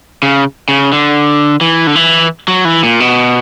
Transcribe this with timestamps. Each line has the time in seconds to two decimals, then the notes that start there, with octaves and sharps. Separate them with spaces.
0.23 C#3
0.68 C#3
0.93 D3
1.61 E3
1.87 D3
1.95 E3
2.48 F#3
2.65 E3
2.83 A#2
3.00 B2